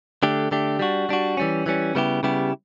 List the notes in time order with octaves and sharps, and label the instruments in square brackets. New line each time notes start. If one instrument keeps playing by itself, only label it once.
[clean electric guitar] D3 A3 D4 G4
D3 A3 D4 G4
G3 D4 F#4
G3 D4 F#4
E3 G3 C#4
E3 G3 C#4
C#3 G3 B3 E4 G4
C#3 G3 B3 E4 G4